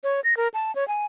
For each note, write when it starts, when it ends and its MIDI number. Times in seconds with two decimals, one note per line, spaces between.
0.04 0.21 73
0.24 0.36 94
0.37 0.48 70
0.54 0.74 81
0.75 0.87 73
0.88 1.06 80